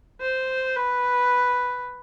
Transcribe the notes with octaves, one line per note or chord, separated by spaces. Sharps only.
C5
B4